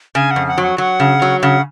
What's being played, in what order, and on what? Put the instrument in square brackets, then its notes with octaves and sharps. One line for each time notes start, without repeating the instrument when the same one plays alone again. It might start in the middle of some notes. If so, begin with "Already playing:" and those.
[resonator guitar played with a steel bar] C#3 [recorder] G#5
[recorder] F#5
[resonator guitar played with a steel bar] F2
[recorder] F#5
[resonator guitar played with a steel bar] F#3
[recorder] F#5
[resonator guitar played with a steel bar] F#3 [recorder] F#5
[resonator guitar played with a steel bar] C#3
F#3
[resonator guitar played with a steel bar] C#3 [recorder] F#5